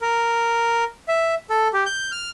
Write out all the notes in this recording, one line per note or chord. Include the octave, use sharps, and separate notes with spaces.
A#4
E5
A4
G4
G6
F6